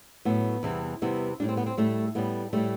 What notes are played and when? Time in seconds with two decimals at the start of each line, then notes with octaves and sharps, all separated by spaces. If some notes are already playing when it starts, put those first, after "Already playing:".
0.25 A2 F#3 B3
0.63 E2 C3 E3 G3
1.02 E2 C3 E3 G3 B3
1.40 A2 G3 D4
1.49 C4
1.57 B3
1.66 C4
1.77 A2 G3 A3
2.15 A2 G3 B3
2.53 A2 G3 A3